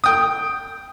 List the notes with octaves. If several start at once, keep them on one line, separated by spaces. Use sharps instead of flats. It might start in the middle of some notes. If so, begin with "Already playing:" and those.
G5 D#6